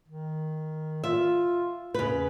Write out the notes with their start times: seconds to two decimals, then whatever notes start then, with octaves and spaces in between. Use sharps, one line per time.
0.08 D#3
1.04 F4 E5
1.94 E2 C#3 B4